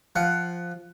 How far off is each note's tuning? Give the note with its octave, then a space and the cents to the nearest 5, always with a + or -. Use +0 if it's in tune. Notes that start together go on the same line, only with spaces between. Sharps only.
F3 +0 F#5 +15